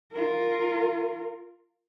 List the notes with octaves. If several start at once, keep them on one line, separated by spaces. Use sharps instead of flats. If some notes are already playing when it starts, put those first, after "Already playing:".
F4 A#4